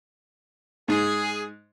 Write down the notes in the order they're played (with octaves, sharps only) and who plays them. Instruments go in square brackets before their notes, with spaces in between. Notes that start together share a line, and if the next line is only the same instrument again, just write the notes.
[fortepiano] G#2 [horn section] G#4